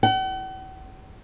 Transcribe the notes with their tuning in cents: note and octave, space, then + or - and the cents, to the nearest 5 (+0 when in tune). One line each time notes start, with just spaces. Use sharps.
F#5 +45